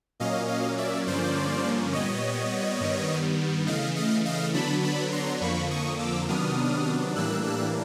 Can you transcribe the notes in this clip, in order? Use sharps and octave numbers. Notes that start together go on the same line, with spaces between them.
A#2 F#3 A#3 C#4 D#5 F5
D#5 F5
D5 E5
G2 D3 F3 A#3 C#4 C5 D5
A#2 G3 B3 C#5 D#5
G2 D#3 G3 B3
C#3 E3 A3 D#5 F5
D#5 F5
D#5 F5
D3 F#3 B3 D4 A5 B5
A5 B5
A#5 C6
F2 D3 F3 A#3 B5 C#6
C#6 D#6
D6 E6
C3 D#3 F#3 B3 D4 D#6 F6
A2 E3 G3 A#3 D4 E6 F#6
E6 F#6